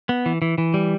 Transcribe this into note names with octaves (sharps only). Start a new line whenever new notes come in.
B3
E3
E3
E3
G3